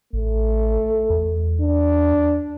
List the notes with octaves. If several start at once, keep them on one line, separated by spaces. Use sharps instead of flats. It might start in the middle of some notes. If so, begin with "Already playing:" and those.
A1 A3
E2
D4